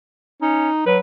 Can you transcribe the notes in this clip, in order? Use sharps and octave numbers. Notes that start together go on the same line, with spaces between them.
C#4 D#4
F#3 B4